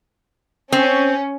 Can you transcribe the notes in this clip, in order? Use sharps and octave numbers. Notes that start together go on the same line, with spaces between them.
C4 C#4